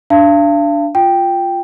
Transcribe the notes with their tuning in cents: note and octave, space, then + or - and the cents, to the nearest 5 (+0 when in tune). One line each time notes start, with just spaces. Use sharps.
D4 +0 F5 -40 A5 +40
F4 +0 G5 +0